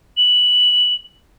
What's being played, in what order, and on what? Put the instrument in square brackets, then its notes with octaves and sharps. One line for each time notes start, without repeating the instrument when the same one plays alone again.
[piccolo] F#7